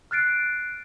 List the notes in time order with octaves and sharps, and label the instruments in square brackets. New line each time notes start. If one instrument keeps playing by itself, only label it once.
[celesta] F6 F#6 A6 C7 D7